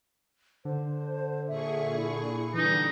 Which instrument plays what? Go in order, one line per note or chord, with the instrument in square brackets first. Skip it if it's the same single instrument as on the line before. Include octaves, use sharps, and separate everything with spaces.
[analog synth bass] D3 [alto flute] C5
[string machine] A#2 G#4 C#6 [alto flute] E5
[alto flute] E4
[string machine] D3 G3 D4 [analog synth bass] E3 [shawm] D#4